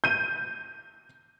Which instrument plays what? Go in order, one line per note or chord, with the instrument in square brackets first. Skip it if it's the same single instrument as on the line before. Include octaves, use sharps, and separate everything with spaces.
[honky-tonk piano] G6 D#7